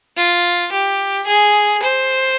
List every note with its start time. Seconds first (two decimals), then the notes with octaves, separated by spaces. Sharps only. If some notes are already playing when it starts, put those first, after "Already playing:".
0.17 F4
0.72 G4
1.27 G#4
1.82 C5